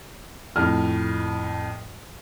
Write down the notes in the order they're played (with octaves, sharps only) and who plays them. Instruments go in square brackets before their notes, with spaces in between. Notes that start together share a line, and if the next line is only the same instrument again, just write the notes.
[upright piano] F2 A2 [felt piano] F6